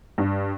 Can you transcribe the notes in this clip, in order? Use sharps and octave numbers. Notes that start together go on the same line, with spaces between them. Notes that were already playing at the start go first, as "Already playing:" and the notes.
G2